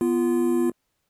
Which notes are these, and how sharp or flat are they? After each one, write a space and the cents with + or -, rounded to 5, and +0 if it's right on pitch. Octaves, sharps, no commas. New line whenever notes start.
B3 -5 F4 -20